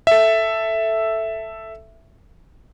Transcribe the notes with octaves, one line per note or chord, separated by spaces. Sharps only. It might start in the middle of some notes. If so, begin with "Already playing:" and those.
A4 E5